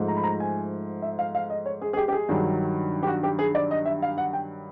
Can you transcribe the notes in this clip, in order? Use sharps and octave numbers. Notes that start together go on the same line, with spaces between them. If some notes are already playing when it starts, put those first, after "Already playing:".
Already playing: G#2 F3 A3
A#5
B5
A#5
G#5
E5
F5
F5
D#5
C#5
G#4
G#4
G4
G4
G#4
G2 D#3 F#3
G4
F#4
G4
G#4
D5
D#5
E5
F5
F#5
G5